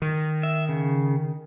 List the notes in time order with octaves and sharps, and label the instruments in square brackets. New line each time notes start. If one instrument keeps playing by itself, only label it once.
[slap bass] D#3
[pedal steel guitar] E5
C#3